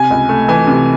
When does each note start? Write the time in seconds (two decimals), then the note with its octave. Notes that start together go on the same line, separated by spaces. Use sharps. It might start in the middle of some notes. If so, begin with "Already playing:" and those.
Already playing: C3 G#5
0.11 C#2
0.29 A3
0.48 E3 G#5
0.67 C3